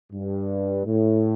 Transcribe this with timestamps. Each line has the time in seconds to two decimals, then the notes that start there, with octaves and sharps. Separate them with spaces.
0.12 G2
0.85 A2